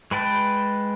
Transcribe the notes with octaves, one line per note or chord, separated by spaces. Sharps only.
G#3 B4 G5 A5